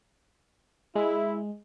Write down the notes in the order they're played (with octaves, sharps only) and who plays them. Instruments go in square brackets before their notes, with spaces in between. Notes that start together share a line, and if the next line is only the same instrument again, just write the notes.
[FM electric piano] G#3 [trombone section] E4